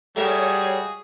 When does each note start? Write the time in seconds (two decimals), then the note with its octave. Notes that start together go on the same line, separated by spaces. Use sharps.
0.16 G3 A3 F#4 G#4 A#4 C#5 E5